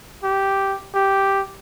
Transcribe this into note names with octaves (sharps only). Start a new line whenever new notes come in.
G4
G4